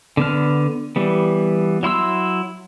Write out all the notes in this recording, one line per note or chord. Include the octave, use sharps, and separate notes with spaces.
D3 B3 F6
E3 G3 B3
F#3 E4 C6 E6